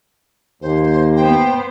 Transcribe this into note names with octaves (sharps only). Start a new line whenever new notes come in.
D#2 A#3 C5
B3 C5 G5